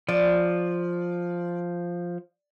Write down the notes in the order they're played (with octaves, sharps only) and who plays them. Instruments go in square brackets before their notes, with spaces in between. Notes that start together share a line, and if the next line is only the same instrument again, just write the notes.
[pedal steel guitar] F3 [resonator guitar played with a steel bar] D5